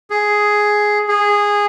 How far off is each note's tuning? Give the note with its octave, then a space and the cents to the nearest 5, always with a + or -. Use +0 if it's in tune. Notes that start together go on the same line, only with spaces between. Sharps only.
G#4 +5
G#4 -15